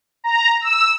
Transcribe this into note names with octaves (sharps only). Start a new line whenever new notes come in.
A#5
E6